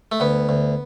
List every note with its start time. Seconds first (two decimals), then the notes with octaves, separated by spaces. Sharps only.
0.12 A3
0.20 D2 B3
0.49 D2